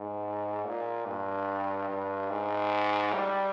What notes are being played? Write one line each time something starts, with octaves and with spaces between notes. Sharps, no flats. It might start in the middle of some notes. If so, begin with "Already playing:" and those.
Already playing: G#2
A#2
G2
G2
G#2
G3